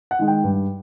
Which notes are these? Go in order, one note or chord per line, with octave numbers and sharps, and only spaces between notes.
F#5
D#3 G#3
G5
G2